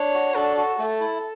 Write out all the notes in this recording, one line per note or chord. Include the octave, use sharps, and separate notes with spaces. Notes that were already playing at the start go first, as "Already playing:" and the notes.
Already playing: D4 C#5
F#4
D4 A4
F#4
A3 A4
E4